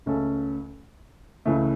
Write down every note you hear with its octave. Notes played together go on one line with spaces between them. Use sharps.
C#2 C#3 A3 C#4 A4
C#2 C#3 E3 A3 C#4